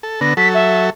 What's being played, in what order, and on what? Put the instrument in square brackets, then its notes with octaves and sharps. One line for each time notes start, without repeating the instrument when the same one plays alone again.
[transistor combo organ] A4
[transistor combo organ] D3 B3 [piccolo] A#6
[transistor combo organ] F#3 A4 [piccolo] B6
[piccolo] E5